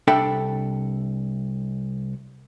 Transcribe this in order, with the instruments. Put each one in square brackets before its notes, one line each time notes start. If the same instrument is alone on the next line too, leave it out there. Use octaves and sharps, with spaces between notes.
[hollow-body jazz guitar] C2 D4 A4 E5 G5 B5